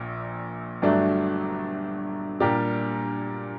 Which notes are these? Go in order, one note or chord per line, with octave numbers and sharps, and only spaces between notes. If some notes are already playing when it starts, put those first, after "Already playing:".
Already playing: A#1 A#2
G1 G2 F#3 A3 D4
A#2 G3 A#3 D4 G4